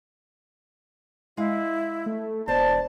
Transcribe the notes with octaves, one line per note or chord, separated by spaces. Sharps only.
G#3 E4 F5
A3
E1 B2 C5 D5 A5